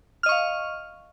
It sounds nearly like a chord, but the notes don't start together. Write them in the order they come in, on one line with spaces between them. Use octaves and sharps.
F6 D#5 C#6 F5